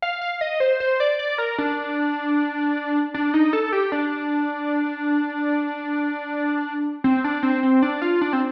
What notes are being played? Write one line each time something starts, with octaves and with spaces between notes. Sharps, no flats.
F5
F5
D#5
C5
C5
D5
D5
A#4
D4
D4
D#4
A4
G4
D4
C4
D4
C4
C4
D4
F4
D4
C4